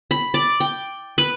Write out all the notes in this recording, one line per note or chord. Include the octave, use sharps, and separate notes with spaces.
B5
D5
G5
B4